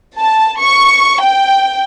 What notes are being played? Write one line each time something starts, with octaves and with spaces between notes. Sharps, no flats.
A5
C#6
G5